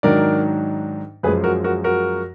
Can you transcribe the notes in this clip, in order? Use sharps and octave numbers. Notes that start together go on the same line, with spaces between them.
G#2 D#3 F#3 D4 A#4 D5
F#2 F3 G#3 G#4 B4
F#4 A#4
F#4 A#4
F#4 A#4